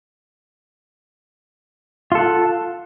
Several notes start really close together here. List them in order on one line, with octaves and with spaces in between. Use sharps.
F4 A4 F#5